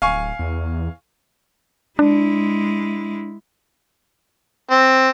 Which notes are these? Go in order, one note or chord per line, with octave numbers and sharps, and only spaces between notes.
D1 F5 G#5 C#6
E2
G#3 D4 E4
C4